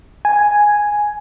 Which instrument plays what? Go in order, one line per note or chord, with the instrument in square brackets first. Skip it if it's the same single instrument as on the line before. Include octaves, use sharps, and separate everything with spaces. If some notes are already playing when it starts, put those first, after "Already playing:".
[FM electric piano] G#5